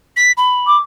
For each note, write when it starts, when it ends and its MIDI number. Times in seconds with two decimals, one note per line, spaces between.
0.16 0.32 95
0.37 0.76 83
0.67 0.78 86